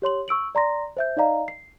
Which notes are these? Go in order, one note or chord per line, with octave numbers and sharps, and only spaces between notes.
G4 C#5 C6 F#7
C#6 E6 D7 F#7
D5 A#5 C6 A#6
C5 E5 G6
D#4 D5 D#5 F5 A#5
C7